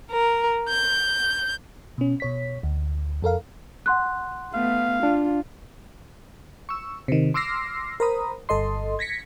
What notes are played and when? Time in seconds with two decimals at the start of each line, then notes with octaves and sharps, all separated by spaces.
0.11 A#4
0.68 G6
1.98 B2 C#4
2.20 B2 C#5 B6
2.63 D2
3.22 F2 A4 A#4 F5
3.86 F#5 C6 F#6
4.54 A3 B3 F5
5.03 D4 F4
6.69 C#6 E6
7.08 C3 D#3
7.34 C6 D6 E6 F6 A#6 C7
8.00 A#4 C5 A#5 B5 D#6
8.49 G1 A4 D#5 C6
8.99 G#6 A#6 B6 C#7